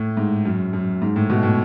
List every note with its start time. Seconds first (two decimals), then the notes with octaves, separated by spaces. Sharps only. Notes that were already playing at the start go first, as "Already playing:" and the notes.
Already playing: A2
0.17 G#2
0.45 F#2
0.73 F#2
1.02 G#2
1.16 A2
1.30 B2
1.43 A2